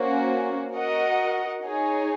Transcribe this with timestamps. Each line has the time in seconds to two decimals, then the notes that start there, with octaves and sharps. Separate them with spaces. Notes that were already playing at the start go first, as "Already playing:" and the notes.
Already playing: A#3 C#4 F#4 C5
0.75 F#4 A#4 D#5 F#5
1.63 D#4 G#4 C#5